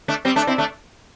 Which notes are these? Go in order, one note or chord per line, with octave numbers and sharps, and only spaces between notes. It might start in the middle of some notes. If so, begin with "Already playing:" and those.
A3 D4
G3 C4
A3 D4
C4 E4
A3 D4